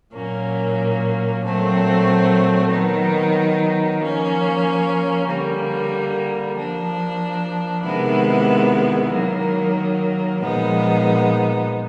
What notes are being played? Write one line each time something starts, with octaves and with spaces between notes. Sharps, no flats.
A#2 F#3 A#3 C#4
A#2 F#3 A3 C4
D#3 F#3 B3 D#4
F3 A#3 C#4
D3 G3 A#3
F3 A#3 D4
C3 D#3 G#3 B3 E4
D#3 F#3 A#3
A#2 F3 G#3 B3 D#4